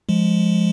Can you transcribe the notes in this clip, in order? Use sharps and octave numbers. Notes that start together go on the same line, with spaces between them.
F3 G#3